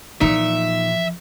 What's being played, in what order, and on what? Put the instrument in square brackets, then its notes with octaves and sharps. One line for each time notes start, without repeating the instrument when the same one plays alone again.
[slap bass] A#2 [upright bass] E3 F3 [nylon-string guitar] D#4 [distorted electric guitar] E5